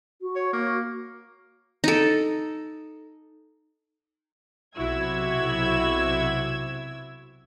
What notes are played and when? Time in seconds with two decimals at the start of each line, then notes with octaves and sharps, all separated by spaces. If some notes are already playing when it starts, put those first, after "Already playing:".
0.21 F#4
0.36 C#5
0.53 A#3
1.84 D#4 A4
4.76 B1 C3 E4 F#4 E6 G#6